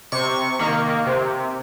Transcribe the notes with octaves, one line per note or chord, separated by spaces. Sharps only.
C3 C#6
D#3 A#3
C3